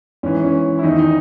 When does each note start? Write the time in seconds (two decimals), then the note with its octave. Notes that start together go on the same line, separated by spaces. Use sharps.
0.23 G#2 E3 C#4
0.43 C#4
0.79 E4
0.83 E2 D#3 D#4
0.98 D#4